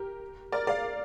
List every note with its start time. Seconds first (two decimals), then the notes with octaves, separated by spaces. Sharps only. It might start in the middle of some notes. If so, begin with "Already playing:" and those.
Already playing: G4 A#4
0.52 A#4 D5
0.67 D5 F5